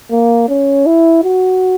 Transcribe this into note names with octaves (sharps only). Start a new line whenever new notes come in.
A#3
C#4
E4
F#4